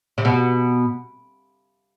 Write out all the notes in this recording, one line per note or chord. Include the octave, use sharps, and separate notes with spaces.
C3
B2